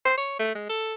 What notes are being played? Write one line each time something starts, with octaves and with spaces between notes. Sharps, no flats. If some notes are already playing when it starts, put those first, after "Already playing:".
C5
C#5
A3
G#3
A4